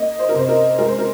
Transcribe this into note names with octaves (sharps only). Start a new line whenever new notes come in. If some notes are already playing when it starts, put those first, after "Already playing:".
Already playing: A#3 D#5
C5
A#4
C3 C5
A#4
G#3 A#4
C5
A#4